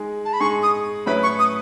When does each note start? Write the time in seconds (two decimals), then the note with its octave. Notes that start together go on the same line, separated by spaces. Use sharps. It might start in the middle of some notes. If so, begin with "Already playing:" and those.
Already playing: G#3 D#4 G#4
0.25 A5
0.33 B5
0.40 G#3 D#4 G#4 C#6
0.63 D#6
1.06 A2 F#3 C#4 E4 B4 B5
1.23 C#6
1.39 D#6